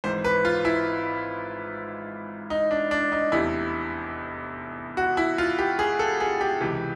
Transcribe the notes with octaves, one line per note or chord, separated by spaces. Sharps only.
G#1 G#2 E3 C5
B4
F4
E4
D#4
D4
D4
D#4
F1 E2 C3 E4
F#4
E4
F4
G4
G#4
A4
G#4
G4
C#2 C3 E3